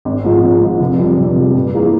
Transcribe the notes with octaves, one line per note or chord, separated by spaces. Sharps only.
G#1
G#2 F3
G#1
G#2 F3
F1
F2 C3 G3
F1
F2 C3 G3
G2
E3 A#3 F4 G#4